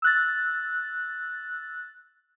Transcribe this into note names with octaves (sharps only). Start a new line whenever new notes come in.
E6 F#6 A6